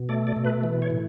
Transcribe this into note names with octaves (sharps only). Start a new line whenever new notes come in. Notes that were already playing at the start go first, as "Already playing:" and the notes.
Already playing: B2
A3 D5
D5
B2
B4
E3
C#5
A2